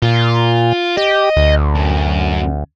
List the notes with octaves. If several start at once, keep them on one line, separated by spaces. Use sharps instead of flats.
A#2 F4
G4 D#5
D2
F#2